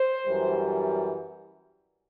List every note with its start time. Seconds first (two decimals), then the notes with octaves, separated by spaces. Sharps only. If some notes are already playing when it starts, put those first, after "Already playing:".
Already playing: C5
0.25 F#2 E3 G3